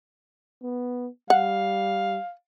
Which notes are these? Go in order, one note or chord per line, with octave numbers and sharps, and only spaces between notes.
B3
G3 F5 F#5